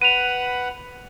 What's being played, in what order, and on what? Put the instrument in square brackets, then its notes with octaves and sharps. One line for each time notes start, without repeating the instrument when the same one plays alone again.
[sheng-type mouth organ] B4 F#5 B5 [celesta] D#7 F7